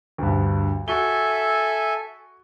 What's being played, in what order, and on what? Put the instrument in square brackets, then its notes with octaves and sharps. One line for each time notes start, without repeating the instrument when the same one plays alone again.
[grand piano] D2 G2
[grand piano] F#4 G7 [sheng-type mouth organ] A4 E5 G#5